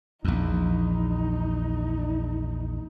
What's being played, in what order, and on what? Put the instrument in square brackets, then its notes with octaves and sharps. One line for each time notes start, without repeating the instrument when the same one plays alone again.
[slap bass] A#1 E2 [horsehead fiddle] D#4